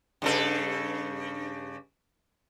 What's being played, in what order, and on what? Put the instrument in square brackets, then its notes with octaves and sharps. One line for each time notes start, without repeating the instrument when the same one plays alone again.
[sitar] G2 C#3 A4